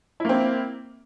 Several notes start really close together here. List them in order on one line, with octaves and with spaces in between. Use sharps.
E4 A#3 C4